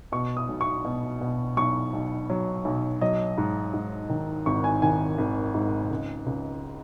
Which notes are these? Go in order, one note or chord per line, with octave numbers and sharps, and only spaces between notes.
B2 C#6
D#6
B1
C#6
B2
B2
B1 C#6
B1
F#3
B1
F#3 D#5
G#2
G#2
D#3
G#1 C#6
G#5
D#3 G#5
G#1
G#2
C#2
C#2